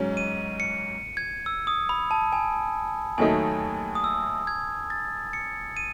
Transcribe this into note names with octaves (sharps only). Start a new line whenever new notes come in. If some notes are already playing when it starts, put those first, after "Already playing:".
Already playing: G#2 F#3 C#4
D#7
C#7
G#6
E6
D#6
B5
A5
G#5
D#2 D#3 F#3 A3 D#4 G#5
D#6
E6
G#6
A6
C#7
D#7